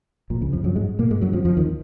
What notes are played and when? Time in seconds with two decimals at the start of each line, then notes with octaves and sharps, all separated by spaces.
0.30 A#1 A#2
0.41 C#2 C#3
0.53 F2 F3
0.64 F#2 F#3
0.76 G#2 G#3
0.99 A#2 A#3
1.11 G#2 G#3
1.21 F#2 F#3
1.33 F2 F3
1.45 F2 F3
1.57 D#2 D#3